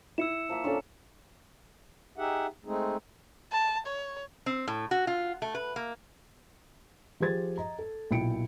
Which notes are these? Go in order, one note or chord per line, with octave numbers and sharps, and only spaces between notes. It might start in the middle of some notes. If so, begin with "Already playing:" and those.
E4 E6 C#7 E7
F3 A#3 E5
C#4 D4 A4 C#5
D#4 G4 G#4 E5 F#5
G#3 A3 C4 D#4 G#4
A5
C#5
C4
A2
F#4
F4
A3
B4
A#3
F3 G4 G#4 C5 G#6 A6
D#5 A#5
A4
B1 A#2 E4 G5 C#7 D7